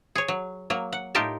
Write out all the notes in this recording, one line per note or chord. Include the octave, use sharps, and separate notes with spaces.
G#4 C#5
F#3
F#3 A#3
F#5
A2 D#4 F4 G4 A#4 A5